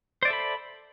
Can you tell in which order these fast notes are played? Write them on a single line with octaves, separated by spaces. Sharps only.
C5 D5 E5 A4 B5